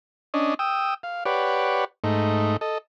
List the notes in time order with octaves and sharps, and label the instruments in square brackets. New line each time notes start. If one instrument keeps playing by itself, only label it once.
[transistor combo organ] C#4 D4 D#5
G5 D#6 E6
F5
G4 B4 C#5 D5 F#5
G#2 A3 D#4
A4 D#5